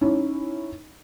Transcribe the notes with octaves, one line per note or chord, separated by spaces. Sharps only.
C#4 D#4 E4